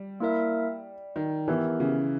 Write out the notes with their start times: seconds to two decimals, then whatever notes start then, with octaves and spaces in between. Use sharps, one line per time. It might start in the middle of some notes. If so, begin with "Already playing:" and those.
Already playing: G3
0.20 A#3 E4 A#4 E5
1.16 D#3
1.48 E3 B3 G4 A#4 E5
1.80 C#3